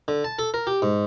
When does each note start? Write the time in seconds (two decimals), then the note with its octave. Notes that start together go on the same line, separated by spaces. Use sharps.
0.08 D3
0.24 A5
0.39 A4
0.54 A#4
0.67 G4
0.82 G#2